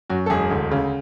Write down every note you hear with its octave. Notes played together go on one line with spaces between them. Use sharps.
F#2 F#4
A4
E1 G#4
D2
C#3